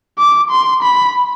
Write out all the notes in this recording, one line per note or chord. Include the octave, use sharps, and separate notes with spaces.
D6
C6
B5